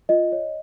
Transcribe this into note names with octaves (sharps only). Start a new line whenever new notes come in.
F4 D#5
C#5